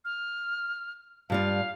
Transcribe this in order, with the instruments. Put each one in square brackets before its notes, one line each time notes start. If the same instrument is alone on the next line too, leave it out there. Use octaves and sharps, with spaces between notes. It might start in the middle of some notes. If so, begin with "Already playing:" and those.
[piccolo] F6
[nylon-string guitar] G2 G3 F4 [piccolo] F5